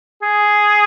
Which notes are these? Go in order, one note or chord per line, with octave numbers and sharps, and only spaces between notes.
G#4